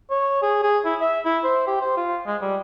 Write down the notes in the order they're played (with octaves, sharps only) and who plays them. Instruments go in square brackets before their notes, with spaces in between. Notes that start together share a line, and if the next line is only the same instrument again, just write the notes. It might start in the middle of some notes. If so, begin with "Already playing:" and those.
[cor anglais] C#5
G#4
G#4
E4
E5
E4
C5
G4
C5
F4
G#3
G3